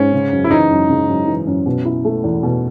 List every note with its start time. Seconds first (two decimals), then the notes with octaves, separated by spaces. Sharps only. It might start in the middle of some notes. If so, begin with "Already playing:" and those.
Already playing: G#2 C#4
0.13 C#3
0.32 F#2
0.44 E4
0.51 E3 D#4
0.71 F#2
0.90 C#3
1.08 F#2
1.28 E3
1.47 F#2
1.66 B2
1.85 E4
2.05 A3
2.24 E2
2.43 B2